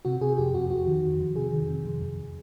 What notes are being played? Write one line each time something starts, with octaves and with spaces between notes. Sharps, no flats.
C3 F#4
C3 G#4
F2 G4
F2 F#4
F2 F#4
D#3
F2
F2
C3 G#4
D#3
C3
F2
F2